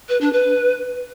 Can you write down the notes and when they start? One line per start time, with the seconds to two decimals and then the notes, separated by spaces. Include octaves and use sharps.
0.09 B4
0.21 D4
0.33 B4